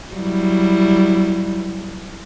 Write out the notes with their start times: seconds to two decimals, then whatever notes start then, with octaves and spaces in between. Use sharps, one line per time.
0.13 F#3 G3 E4